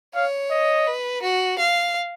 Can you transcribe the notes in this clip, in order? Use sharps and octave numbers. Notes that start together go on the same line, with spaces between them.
C#5 F5
D#5
B4
F#4
F5